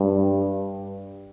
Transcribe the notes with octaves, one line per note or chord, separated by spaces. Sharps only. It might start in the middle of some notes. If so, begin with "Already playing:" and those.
Already playing: G2